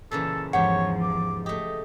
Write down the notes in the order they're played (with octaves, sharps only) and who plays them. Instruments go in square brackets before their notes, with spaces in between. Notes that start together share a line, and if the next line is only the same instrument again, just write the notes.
[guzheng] A#2 C#3 E3 [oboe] A4
[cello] E2 F3 [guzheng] G#2 G4 [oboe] C#5 [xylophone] F#5
[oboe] D6
[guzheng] A3 G4 [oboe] D#5